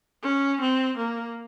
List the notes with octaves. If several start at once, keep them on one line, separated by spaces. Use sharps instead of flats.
C#4
C4
A#3